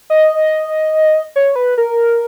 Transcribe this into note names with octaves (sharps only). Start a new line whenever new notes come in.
D#5
C#5
B4
A#4